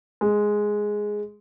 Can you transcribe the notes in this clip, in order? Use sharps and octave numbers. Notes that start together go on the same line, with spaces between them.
G#3